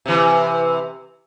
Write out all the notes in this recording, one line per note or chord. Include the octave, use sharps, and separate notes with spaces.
C3 E3